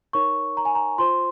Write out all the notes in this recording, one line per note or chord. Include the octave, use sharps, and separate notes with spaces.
D#4 A#4 C#5 C#6
A#5
G#5
A#5
F4 C5 C6